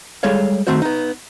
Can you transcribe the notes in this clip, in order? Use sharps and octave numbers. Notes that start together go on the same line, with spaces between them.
G3 G#3 A4 C#5 F5
D#3 A3 C4 F#4 C5
B3 D#4